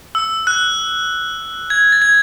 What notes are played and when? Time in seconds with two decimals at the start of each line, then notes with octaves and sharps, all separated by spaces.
0.15 E6
0.47 F#6
1.70 G#6
1.92 A6
2.02 G#6